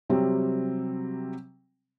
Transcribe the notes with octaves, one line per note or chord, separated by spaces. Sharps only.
C3 F#3 G3 C4